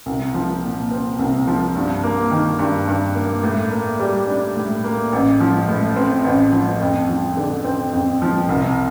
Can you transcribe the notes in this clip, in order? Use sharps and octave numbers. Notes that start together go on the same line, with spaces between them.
C2
F3
A#2
C4
C2
F3
G2
A#3
D#3
G2
G2
A#3
A2
A#3
G3
D4
A2
A#3
A1
F3
A2
C4
A1
F3
F2
F3
D3
C4
F2
F3
C2